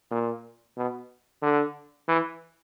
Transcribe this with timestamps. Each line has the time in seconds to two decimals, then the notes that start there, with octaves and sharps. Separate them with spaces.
0.11 A#2
0.77 B2
1.42 D3
2.08 E3